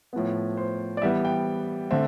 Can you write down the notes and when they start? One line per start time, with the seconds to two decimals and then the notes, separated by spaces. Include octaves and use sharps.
0.13 A2 F3 B3
0.57 C5
0.97 D5
1.02 E3 G3 B3 E5
1.25 G5
1.91 D3 A3 C4 E5